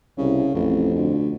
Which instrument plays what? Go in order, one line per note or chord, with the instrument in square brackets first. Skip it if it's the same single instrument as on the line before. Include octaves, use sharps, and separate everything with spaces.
[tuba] C2 [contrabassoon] C#3
[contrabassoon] A1 [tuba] F2
[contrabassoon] D2